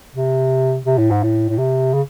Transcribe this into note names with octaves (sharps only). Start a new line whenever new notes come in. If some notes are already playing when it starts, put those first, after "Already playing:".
C3
C3
A2
G#2
A2
A2
C3
C#3